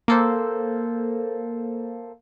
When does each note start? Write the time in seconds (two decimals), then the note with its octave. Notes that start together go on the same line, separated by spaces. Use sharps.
0.08 A#3 A4 C5